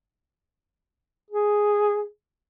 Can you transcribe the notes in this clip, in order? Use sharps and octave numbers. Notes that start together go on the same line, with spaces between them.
G#4